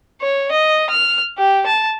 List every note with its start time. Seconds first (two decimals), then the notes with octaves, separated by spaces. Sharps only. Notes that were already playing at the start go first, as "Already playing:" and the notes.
0.22 C#5
0.51 D#5
0.90 F6
1.38 G4
1.66 A5